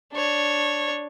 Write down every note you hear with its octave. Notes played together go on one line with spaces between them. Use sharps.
D4 C#5